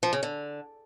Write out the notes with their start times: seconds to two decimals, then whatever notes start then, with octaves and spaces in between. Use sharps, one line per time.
0.03 F3
0.13 C#3
0.23 D3